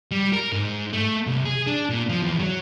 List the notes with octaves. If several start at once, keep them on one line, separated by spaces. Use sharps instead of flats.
G3
A#4
G#2
A3
C2
G#4
D4
A#2
F3
E2
F#3